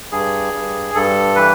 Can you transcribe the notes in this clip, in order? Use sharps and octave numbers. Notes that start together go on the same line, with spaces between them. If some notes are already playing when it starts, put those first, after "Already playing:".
G2 G#4
G2
G2 A4
E3 B4